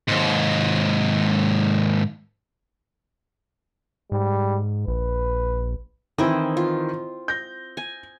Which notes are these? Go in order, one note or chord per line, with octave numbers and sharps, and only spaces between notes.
D#2 G#2
G#2 G3
A#1 B4
D#3 E3 C4 E4 D#5
F4
G6 A#6
G#5